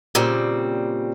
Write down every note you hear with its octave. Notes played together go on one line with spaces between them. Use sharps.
A#2 C#3 G3 C4